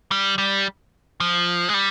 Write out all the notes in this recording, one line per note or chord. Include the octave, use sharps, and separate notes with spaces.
G3
G3
F3
G#3
G3